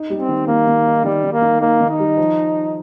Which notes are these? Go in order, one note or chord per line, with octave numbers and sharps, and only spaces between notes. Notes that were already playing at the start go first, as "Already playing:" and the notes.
Already playing: D#4
G3
C4
D#3
D#3 A#3
D#3
D#4
D#3 G3
D#3
A#3
D#3
A#3 D#4
D#3
D#4
G3
F3